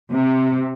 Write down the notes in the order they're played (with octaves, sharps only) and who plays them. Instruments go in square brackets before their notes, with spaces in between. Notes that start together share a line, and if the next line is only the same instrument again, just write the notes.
[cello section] C3